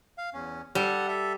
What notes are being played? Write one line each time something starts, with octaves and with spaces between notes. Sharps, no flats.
F5
E2 C#4
G3 A4 F#5
A4 E5